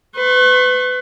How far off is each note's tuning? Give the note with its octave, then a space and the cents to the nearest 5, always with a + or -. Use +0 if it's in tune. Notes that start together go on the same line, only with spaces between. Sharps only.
B4 +30 C#6 -40